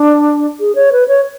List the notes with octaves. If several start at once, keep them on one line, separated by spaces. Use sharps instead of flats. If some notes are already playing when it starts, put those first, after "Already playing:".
Already playing: D4
G#4
C#5
B4
C#5